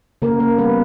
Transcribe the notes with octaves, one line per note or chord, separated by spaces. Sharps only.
C#3 A#3 A#4
A#3
G3 B3 B4